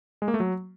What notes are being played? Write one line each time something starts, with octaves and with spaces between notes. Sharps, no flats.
G#3
A#3
A3
F#3